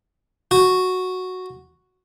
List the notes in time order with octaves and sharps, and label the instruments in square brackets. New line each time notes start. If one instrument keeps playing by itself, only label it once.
[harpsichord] F#4